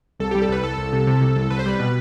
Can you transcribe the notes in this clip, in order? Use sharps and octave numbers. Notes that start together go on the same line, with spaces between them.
C2 A4
G3 G4
A4
C2 B4
C2 A4
C2
C3
C3
C2
C2
C2 B4
C5
G3 B4
B2